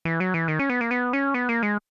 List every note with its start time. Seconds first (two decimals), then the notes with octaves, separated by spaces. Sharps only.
0.05 E3
0.20 F#3
0.34 E3
0.48 D#3
0.59 C#4
0.70 B3
0.81 A#3
0.91 B3
1.13 C#4
1.34 B3
1.49 A#3
1.63 G#3